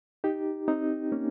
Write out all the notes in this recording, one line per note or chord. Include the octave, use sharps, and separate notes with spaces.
D#4 G4
C4 D#4
A#3 C#4